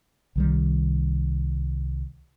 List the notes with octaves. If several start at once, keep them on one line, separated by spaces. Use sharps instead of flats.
C2 D#3 G3